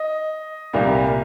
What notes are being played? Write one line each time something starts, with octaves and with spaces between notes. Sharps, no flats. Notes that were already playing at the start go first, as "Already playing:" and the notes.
Already playing: D#5
C2 A#2 G3 A#3